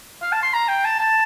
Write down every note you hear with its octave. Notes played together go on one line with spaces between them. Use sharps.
F5
A5
C6
A#5
G5
A5
A5